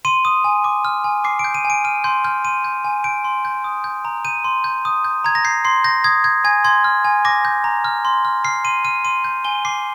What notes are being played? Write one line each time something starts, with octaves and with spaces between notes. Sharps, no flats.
C6 D#7
D#6
G#5
D6
F6
G#5
D6 C7
D7
G6
D#7
G#5
D7
F6 D#7
C6 G6
F6 G6
C6 D#7
G6
G#5
G6 D7
C6
G6
D#6
G6
A#5
G6 D#7
C6
G6
D#6
G6
A#5 G#6
A#6
G6 C7
C6 C7
G6 A#6
D#6 G#6
G6 G#6
G#5 G#6
C6 G#6
F6
G#5
D6 A#6
G6
A#5
F6
C6
F6
F6 C7
C6 D#7
F6 D#7
C6 D#7
G6
G#5 G7
D6 C7